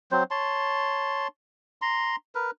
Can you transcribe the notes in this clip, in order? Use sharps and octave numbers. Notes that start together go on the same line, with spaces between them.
F#3 C4 C5
C#5 A5 C6
A#5 C6
A#4 B4